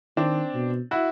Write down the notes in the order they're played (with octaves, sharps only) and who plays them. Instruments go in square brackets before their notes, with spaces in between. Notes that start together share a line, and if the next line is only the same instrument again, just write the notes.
[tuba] D#3 [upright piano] C4 D4
[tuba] B2
[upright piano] E4 F#4